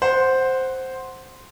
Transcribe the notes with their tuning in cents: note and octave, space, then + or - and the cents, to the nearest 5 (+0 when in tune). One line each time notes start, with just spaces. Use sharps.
C5 +0 F#5 +0